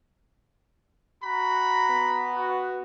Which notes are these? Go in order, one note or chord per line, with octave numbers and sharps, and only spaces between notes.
F#4 A#5 B5
B3
F#4